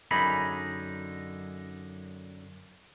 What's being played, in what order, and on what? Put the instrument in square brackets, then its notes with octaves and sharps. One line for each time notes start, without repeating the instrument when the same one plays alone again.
[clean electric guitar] F#2 D3 D#4 G#4 B5